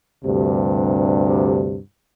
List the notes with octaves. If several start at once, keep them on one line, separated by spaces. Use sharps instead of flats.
D2 G2 C3